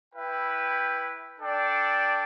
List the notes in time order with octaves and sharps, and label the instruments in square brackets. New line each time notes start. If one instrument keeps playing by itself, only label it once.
[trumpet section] E4 B4 E5 G5
D4 A4 D5 G5